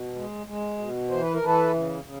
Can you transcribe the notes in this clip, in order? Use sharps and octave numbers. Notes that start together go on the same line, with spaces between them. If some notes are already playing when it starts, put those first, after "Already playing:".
Already playing: B2
G#3
G#3
B2
E3 C5
B4
A#4
E3 A4 B4
C#3
C#3